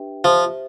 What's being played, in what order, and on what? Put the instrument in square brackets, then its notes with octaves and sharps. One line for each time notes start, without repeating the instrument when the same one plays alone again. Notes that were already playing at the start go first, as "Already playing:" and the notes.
Already playing: [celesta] D4 G4 B4 E5 G5
[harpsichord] F3 [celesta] G4 C5 E5